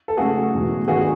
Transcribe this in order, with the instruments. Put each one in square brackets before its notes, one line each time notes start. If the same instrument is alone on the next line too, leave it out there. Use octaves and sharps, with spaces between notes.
[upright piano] A4
[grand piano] C#3 F#3 A3 [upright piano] F#4 G#4
[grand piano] E2 B2 F#3 A3
[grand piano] D#3 F#3 B3 D4 [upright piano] F#4 G#4